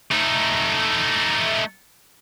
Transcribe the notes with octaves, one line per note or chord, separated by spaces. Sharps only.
A3 D#4